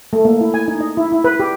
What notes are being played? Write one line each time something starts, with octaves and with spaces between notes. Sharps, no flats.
A3
A#3
E4
G#5
D#4
D#5
E4
E4
B4
G4